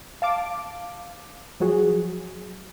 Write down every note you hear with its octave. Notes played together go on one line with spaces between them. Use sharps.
F5 A5 D6
F3 F#3 F#4 G#4